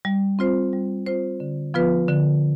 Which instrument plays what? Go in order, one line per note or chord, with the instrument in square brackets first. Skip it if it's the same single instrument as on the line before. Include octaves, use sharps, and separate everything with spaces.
[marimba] G3
C4 F4 C5
G3
C4 F4 C5
D3
F3 B3 F4 B4
D3